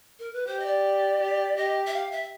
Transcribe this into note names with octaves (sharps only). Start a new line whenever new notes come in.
A#4
B4
G4 C5
D#5
D5
G4
G4 D#5
E5
F5
E5